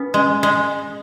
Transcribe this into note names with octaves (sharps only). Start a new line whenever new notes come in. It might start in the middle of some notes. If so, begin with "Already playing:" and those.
Already playing: B3 C#4
G#3
G#3